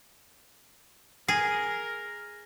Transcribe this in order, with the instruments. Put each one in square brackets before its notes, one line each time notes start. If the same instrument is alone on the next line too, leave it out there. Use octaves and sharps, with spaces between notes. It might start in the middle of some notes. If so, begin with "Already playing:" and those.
[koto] G#4 [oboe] A#4